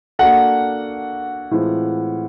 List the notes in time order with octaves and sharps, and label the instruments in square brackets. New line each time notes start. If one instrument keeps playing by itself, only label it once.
[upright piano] A#3 D4 F#4 A4 [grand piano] F#5
[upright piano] A2 E3 G#3 C4 F4